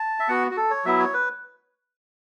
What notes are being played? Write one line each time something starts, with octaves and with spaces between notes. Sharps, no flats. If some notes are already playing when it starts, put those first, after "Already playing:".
Already playing: A5
E5
B3 F#4 F#5
F#4
A4
C#5
F#3 B3 E4 E5
C#5
B4